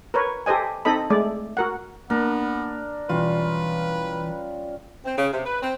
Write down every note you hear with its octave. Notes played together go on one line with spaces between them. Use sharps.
A#4 B4 C#5
G4 A4 C5 D#5 G#5
C4 D#4 A4 D#5 B5
G#3 A3 D5
F#4 A#4 F#5
A#3 B3 D4 A#4
B1 E3 G3 C#4 F4 B4
C4
C#3
C3
B4
C4